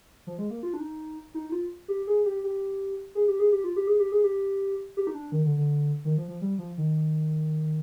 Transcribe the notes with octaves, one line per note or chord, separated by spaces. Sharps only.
F3
G#3
A#3
F4
D4
D#4
D#4
D#4
F4
G4
G#4
G4
G4
G#4
G4
G#4
G4
F4
G4
G#4
G4
G#4
G4
G4
D#4
D4
D#3
D3
D3
D#3
F3
F3
G3
F3
D#3